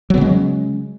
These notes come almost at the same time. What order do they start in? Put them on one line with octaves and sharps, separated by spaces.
F#3 B3 C#3 G#3